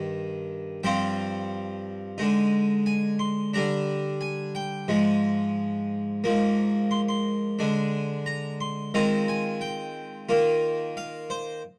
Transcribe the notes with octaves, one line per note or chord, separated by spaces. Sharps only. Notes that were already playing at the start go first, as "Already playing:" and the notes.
Already playing: G2 D#3
G2 F3 C4 F4 G5
D3 G#3 D#4
G#5
C6
D3 G3 D4 A#5
G#5
G5
G#2 F3 G#3
G#2 F3 A#3
C6
C6
D3 G#3 D4
A#5
C6
D#3 G#3 C4 F4 A#5
G#5
G5
D#3 A#3 F4
F5
C5